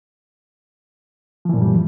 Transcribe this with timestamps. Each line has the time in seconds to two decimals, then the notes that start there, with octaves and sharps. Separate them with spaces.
1.45 F3
1.49 E3
1.53 A#2
1.57 F#2
1.61 G3